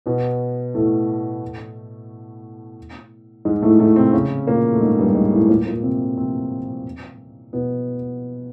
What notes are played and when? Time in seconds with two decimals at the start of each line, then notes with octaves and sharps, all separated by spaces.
0.06 B2 B3
0.74 A2 A3
3.45 G#2 G#3
3.62 A2 A3
3.79 A2 A3
3.96 C3 C4
4.13 C#3 C#4
4.47 A#2 A#3
4.73 A3
4.81 G#2 G#3
4.98 G2 G3
5.15 G#2 G#3
5.32 A2 A3
5.49 A#2 A#3
5.67 A#2 A#3
5.83 C3 C4
6.17 C3 C4
7.53 B2 B3